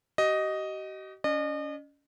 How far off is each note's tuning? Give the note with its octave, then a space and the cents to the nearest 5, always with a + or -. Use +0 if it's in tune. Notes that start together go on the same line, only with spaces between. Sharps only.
G4 -45 D#5 +0
C#4 +35 D#5 -40